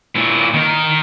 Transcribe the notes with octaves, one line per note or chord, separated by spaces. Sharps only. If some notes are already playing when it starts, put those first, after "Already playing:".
A#2 E4
D#3 A#4